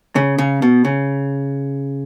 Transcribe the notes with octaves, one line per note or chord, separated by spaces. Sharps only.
C#3
C#3
B2
C#3